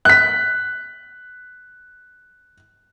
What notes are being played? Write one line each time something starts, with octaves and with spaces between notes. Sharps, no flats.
F#6 B6